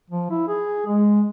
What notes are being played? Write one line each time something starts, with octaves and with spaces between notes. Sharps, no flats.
F3
E4
G#4
G#3